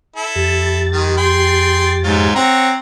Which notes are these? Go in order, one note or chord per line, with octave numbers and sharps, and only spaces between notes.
E4 A4
F2 G4 A6
D#3 G#3
G#4 G5 C6
G#2 F#3 F4
C4 C#5 F#5 A#5